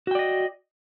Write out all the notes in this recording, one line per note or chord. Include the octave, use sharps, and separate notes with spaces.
F#4 D5 D#5 G5